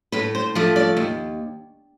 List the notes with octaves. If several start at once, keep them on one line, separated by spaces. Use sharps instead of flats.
A2 B4
C5
F3 A3 D5
D5
D#2